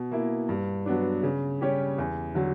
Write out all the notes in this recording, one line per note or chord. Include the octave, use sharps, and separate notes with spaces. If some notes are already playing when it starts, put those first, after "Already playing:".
Already playing: B2
A#3 E4
G2
F#3 B3 D4
C#3
G3 C#4 G4 C#5
E2
D3 F#3